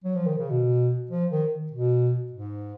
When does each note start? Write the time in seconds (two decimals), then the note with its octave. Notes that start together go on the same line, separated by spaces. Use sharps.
0.04 F#3
0.15 F3
0.27 D#3
0.38 C#3
0.50 B2
1.11 F3
1.31 D#3
1.72 B2
2.32 G#2